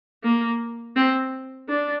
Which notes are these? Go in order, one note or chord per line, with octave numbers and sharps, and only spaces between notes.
A#3
C4
D4